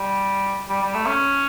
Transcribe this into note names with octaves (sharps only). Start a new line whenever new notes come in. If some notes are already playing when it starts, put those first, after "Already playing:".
Already playing: G3
G3
G3
A3
C#4